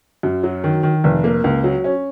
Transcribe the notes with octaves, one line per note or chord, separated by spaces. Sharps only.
F#2
F#3
D#3
D#3
F1
A#3
C#2
F#3
C#4